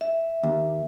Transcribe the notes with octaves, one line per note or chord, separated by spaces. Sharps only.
E5
D#2